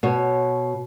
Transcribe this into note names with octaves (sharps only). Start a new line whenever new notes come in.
B2 C#5